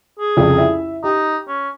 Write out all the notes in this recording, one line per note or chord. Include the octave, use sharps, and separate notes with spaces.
G#4
C2 F2 C#3
E4 E5
D#4 G4
C#4